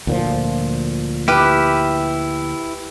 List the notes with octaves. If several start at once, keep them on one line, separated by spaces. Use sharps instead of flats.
D2 A#2 F3
E4 G4 B4 F6